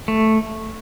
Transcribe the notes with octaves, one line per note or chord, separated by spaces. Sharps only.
A3